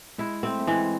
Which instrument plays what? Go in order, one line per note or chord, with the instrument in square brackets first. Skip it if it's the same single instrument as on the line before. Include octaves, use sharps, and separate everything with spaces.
[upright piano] G#3 [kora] E4
[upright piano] A3 [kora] C4
[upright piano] A3
[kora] E3 [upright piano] G#3